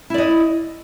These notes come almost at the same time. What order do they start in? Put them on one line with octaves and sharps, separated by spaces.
E4 D5 D#5